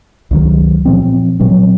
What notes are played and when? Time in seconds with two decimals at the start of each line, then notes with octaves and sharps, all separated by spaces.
0.31 C#2 C3 D#3 F#3
0.85 A#2 F3 C4
1.40 A#2 F#3 C4